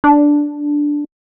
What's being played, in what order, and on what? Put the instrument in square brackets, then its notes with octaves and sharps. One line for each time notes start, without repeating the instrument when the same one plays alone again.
[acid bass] D4